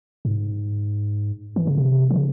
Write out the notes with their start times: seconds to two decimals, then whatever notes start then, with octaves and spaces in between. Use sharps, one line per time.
0.25 G#2
1.56 E3
1.67 C#3
1.77 C3
2.10 E3
2.16 C#3